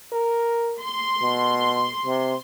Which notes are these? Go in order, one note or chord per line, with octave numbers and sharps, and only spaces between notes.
A#4
C6
B2
C3